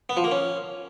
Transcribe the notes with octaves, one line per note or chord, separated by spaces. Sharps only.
B3
F3
A#3
C#4